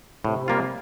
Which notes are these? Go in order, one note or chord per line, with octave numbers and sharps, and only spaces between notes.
A2 C3
G3 A#3 F4